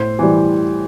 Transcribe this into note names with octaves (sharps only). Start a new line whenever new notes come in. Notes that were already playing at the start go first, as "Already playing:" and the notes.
Already playing: A2 C5
E3 G3